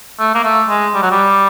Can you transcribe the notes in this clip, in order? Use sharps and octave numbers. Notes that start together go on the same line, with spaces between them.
A3
A#3
A3
G#3
G3
F#3
G3